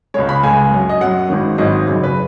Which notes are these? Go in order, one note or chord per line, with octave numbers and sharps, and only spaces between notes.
C#2 C#3 G#3 C#5
B5
C#2 C#3 G#3 G#5
F#2 F#3
D#5
F#2 F#3 F#5
G#1 G#2 D#3 F#3
G#1 G#2 D#3 F#3 D#5
F#1 F#2 C#3 F#3
B4